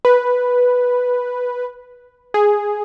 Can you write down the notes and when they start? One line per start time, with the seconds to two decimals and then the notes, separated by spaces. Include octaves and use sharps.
0.05 B4
2.34 G#4